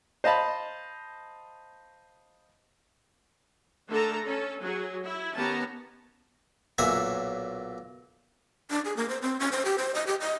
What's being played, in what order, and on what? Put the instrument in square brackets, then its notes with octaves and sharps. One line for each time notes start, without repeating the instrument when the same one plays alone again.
[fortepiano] C5 D#5 F5 A5 B5
[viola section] D3 A3 A4 A#4 A5 A#5
C#4 A4
F#3 G#4
E4
D#3 B3 C#4 G4 A5 A#5
[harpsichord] B1 A#2 F#3 E5 G#5 D#6
[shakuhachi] D4
G#4
A#3
C5
C4
C#4
C5
G4
C5
D#5
G4
D#5